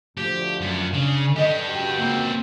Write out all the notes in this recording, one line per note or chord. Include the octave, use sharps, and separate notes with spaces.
D2 F3 G4
F#2
C#3 D4
D4 G4 A4 B4 D#5
C#2 F#4 G5
A#3 C4